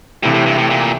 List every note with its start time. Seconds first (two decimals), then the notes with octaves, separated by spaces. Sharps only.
0.23 G2 C3 E3 A3 E4 G4
0.34 A2
0.46 G2
0.58 A2
0.70 A#2